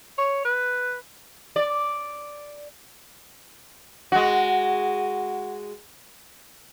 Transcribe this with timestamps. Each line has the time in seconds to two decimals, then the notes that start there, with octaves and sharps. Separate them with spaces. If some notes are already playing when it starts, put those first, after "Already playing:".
0.18 C#5
0.45 B4
1.56 D5
4.12 G#3 F#4